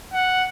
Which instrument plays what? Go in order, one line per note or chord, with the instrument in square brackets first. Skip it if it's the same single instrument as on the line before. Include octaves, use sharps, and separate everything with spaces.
[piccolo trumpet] F#5